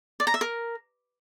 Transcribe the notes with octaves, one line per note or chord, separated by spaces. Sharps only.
D5
A#5
E5
A#4